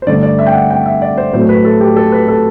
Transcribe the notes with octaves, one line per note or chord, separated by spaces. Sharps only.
C5
G2 D3 A3 D5
D5
E5
G5
F#5
G5
E5
D5
C5
A2 F#3 A3 C5
B4
A4
G4
A4
B4
A4